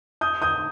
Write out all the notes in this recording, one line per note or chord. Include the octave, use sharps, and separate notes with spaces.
D#6 G6
D#6 G6